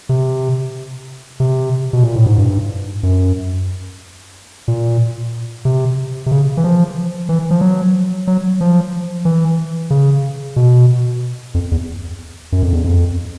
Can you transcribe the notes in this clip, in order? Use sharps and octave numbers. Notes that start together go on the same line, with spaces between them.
C3
C3
B2
A#2
A2
G#2
G2
F#2
A#2
C3
C3
C#3
E3
F3
E3
F3
F#3
F#3
F3
E3
C#3
B2
F2
E2
F#2
F2
E2
F2